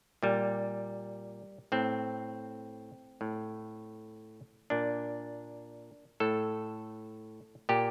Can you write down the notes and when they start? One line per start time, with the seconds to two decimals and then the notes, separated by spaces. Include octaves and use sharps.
0.23 A#2 G3
1.72 A2 C4
3.21 A2
4.70 A#2 D4
6.20 A2 A4
7.69 A#2 G4